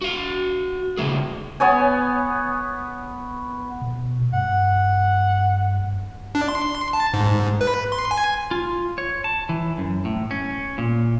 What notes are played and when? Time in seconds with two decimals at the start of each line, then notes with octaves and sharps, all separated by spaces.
0.02 F#4 F5
0.97 C#3 F3 A3 G#4
1.60 B3 C#5 G#5
3.81 B2
4.33 G2 F#5
6.35 D4
6.48 C6
6.93 A5
7.14 G#2
7.61 B4
7.92 C6
8.11 G#5
8.51 F4
8.98 C#5
9.24 A5
9.49 E3
9.78 F#2
10.05 A2
10.31 C#4
10.78 A#2